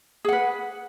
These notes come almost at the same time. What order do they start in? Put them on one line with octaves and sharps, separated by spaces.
G#4 F#5 B4